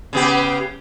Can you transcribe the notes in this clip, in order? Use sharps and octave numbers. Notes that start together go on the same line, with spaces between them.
C#3 B3 G4